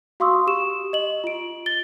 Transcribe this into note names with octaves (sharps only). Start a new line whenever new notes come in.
F#4 F5 C6 C#6 D#6 E6
G4 C#6 E7
D#5 F#7
F4 D7
A6 G7